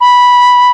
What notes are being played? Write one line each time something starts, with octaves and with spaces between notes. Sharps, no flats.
B5